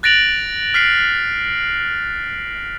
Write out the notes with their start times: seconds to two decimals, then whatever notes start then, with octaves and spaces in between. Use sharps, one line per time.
0.03 F#6 A6 A#6 D7 F7 F#7
0.74 F6 B6 C7 D7